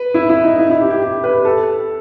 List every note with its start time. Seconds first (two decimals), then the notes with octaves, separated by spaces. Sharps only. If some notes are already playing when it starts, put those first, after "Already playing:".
Already playing: B4
0.14 E4
0.29 E4
0.43 D#4
0.59 E4
0.70 E4
0.80 G4
0.91 G4
1.02 G4
1.24 B4
1.45 A4